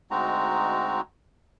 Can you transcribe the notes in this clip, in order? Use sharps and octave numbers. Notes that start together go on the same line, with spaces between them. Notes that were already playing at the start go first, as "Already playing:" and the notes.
D2 G#3 C4 D#4 F#4 A#5